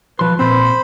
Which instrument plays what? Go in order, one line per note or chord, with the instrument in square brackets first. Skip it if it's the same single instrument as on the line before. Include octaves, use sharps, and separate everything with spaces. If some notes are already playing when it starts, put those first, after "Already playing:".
[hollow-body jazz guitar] B1 F3 C6 [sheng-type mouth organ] B4
[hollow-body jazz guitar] A#2 C4 [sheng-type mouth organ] C5 B5